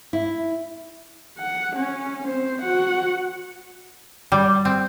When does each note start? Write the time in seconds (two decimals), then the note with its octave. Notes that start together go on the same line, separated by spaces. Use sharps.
0.13 E4
1.38 F#5
1.76 C#4
2.25 C4 C5
2.62 F#4 F#5
4.32 G3
4.65 C4